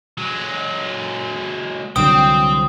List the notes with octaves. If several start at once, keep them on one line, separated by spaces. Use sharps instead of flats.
F#3 G#3
C2 D3 F#3 C4 C5 G5 D#6